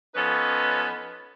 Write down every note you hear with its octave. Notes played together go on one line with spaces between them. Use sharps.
F3 B3 C#4 D#4 A4 B4